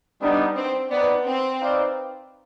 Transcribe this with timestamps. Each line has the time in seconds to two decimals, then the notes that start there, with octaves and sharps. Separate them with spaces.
0.22 G3 B3 D4 D#4
0.56 C4
0.90 B3 D#4 B4 D5
1.26 C4
1.59 D#4 B4 D5 F5